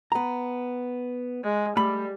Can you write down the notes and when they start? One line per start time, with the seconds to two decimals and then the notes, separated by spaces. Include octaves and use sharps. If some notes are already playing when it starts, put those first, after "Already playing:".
0.12 B3 A#5
1.43 G#3
1.77 G3 A3 B5